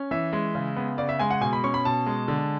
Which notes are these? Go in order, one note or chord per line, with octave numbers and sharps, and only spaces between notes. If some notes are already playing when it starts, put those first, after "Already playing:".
Already playing: C#4
E3 E5
G#3
C#3
B3
C#3 D5
E5
G#3 G#5
F#5
B2 G#5
B5
C#4 C#6
B5
B2 A5
G#3
D3